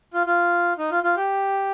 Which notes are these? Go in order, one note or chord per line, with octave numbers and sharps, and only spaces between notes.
F4
F4
D#4
F4
F4
G4